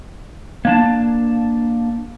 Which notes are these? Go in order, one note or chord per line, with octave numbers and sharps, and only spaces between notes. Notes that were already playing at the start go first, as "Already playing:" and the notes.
A#3 D4 A5